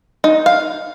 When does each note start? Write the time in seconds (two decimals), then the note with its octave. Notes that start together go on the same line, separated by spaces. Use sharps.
0.24 D#4
0.46 F5